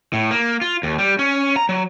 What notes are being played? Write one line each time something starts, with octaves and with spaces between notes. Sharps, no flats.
A2
A#3
F4
D#2
G3
C#4
A#5
F#3